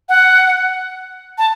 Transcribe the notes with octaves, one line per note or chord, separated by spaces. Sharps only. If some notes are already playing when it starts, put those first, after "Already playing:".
F#5
A5